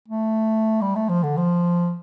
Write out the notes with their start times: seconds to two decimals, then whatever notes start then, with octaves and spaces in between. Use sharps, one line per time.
0.08 A3
0.81 G3
0.95 A3
1.09 F3
1.23 D3
1.37 F3